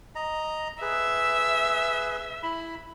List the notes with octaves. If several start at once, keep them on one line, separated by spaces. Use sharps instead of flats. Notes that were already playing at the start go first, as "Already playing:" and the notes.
D#5 A#5
G#4 B4 E5
E4 B5